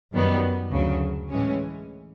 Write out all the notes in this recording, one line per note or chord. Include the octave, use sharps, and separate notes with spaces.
F#2 D#3 G3 B3
D2 C#3 F#3
A2 E3 G#3 C#4